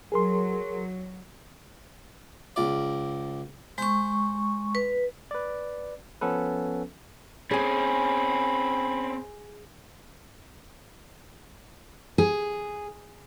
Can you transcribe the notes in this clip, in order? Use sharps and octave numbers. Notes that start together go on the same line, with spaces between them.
F#3 G#4 A#4 C6
C#2 D5
G#3 C5 C#6
B4
B4 D5
F3 B3 C#4 A4 B4
C4 C#4 G#4 G#5 B5
G#4